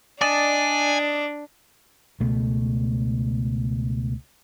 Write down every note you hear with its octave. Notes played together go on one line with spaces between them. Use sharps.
D4 D5 D#5 G#5 A5
C#2 B2 A3